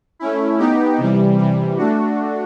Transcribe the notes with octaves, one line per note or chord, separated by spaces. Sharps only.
A3 C#4 E4
B3 D#4 G4
C3 E3 G3
C3 E3 G3
A3 D4 F#4